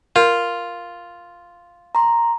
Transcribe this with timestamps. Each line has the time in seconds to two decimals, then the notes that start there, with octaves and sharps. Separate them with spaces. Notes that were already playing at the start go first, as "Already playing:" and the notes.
0.16 F4 A#4
1.95 A#5 C6